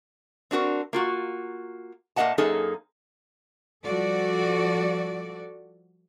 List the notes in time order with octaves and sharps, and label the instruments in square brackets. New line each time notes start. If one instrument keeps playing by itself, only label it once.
[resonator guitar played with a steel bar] C4 D4 F#4 A#4
A#3 F4 F#4
A#2 A#3 A4 D#5 F#5 A5
F#2 A#3 D#4 G#4 A4
[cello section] F3 G3 F#4 A4 D5